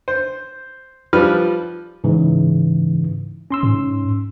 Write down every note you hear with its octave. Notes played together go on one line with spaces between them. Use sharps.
C5
F3 G3 B4 F6
G#2 C#3 E3
C#4 C6 E6
G#2